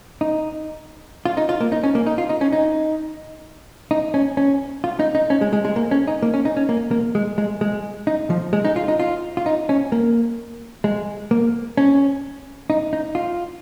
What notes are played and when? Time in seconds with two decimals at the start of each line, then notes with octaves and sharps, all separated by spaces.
0.21 D#4
1.26 F4
1.37 D#4
1.49 F4
1.60 A#3
1.72 D#4
1.83 C#4
1.95 A#3
2.06 D#4
2.18 F4
2.29 D#4
2.41 C#4
2.52 D#4
3.91 D#4
4.14 C#4
4.37 C#4
4.84 F4
5.00 D#4
5.15 D#4
5.30 C#4
5.41 G#3
5.53 G#3
5.65 G#3
5.76 A#3
5.91 C#4
6.07 D#4
6.22 A#3
6.34 C#4
6.45 D#4
6.57 C#4
6.69 A#3
6.91 A#3
7.15 G#3
7.38 G#3
7.61 G#3
8.07 D#4
8.30 F3
8.53 G#3
8.65 D#4
8.76 F4
8.88 D#4
9.00 F4
9.37 F4
9.46 D#4
9.69 C#4
9.92 A#3
10.84 G#3
11.31 A#3
11.77 C#4
12.70 D#4
12.93 D#4
13.15 F4